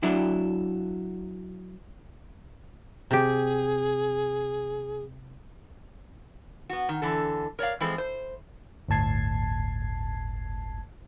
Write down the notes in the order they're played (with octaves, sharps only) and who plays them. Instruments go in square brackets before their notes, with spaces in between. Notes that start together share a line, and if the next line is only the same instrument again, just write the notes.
[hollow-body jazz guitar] F#3 D4 E4
[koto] C3 G4 [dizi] G#4
[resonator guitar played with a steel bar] B3 F#4
D#3
D3 E3 A4
A#4 C#5 D5 F5
E3 F3 G#3 C4 A4
C5
[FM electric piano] G1 D2 A2 A5 G#6 C7